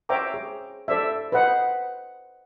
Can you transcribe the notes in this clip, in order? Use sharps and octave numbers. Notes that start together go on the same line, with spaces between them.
C5 C#5 E5 G5 A#5 D6
G#4
A4 C5 D5 E5
B4 C5 D#5 F#5